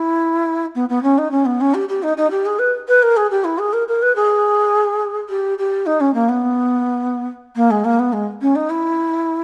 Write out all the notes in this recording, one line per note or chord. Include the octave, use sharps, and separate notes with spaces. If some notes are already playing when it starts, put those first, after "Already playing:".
Already playing: E4
B3
B3
C#4
D#4
C#4
B3
C#4
G4
G4
D#4
D#4
G4
G#4
B4
B4
A#4
G#4
G4
E4
G#4
A#4
A#4
B4
G#4
G4
G4
D#4
C#4
A#3
B3
A#3
G#3
A#3
B3
G#3
C#4
D#4
E4